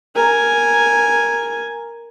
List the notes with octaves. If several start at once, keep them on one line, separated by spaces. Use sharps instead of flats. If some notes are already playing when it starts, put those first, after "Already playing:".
A#4 G#5